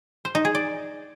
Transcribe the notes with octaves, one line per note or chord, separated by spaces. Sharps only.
C5
D#4
G#4
D5